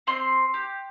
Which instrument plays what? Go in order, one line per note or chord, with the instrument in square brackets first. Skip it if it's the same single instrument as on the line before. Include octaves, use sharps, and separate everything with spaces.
[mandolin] C4 C6
G4